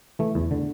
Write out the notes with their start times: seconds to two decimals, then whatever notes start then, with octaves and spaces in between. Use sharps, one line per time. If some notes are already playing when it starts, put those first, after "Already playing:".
0.19 E3 A3
0.35 E2
0.51 D3